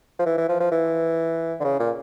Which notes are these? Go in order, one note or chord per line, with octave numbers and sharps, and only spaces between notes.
F3
E3
E3
F3
F3
E3
D3
C#3
A#2